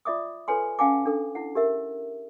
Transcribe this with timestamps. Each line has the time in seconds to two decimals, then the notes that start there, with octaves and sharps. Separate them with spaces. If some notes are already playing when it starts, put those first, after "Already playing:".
0.05 F4 D5 E5 D6 D#6
0.48 F4 A4 B4 C#5 G#5 C6
0.79 C#4 F5 F#5 G#5 A5 D6
1.05 D4 A4
1.35 E4 F#5
1.55 G4 A#4 E5